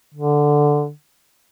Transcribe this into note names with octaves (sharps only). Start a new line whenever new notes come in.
D3